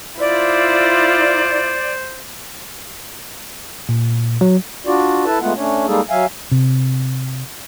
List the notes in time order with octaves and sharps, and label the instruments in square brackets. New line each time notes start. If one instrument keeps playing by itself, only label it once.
[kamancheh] E4 F4 [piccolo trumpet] C5 [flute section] D5
[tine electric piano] A#2
F#3
[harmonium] D4 F4 F#4 D5
E4 A4 B4 A5
G#3 A3 B3 F4 F#5
A3 C#4 D4 C#5
G3 G#3 A#3 D#4 G#4 A4
F#3 E5 F5 G#5
[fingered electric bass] C3